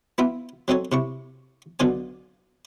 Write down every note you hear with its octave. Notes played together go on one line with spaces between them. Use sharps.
B3 E4 F4 E5
F#3 C4 D#4 A4 C#5
C3 E4 C#6
B1 B2 D3 F4 D5 G#5